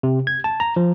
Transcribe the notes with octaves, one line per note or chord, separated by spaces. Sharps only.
C3
G#6
A5
A#5
F3